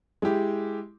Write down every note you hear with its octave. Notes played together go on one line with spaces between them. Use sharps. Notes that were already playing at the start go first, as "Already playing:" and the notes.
G#3 E4 G4